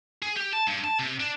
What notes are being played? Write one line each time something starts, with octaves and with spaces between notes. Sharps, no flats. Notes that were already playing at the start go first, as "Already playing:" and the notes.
G#4
G4
A5
G2
A5
C3
D4